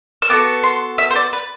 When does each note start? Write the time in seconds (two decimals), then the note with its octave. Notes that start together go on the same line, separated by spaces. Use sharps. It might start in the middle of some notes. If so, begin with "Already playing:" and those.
0.22 E6
0.29 B3 F#4 A4 D6
0.63 C6
0.98 E5
1.11 C5
1.15 D5
1.33 B4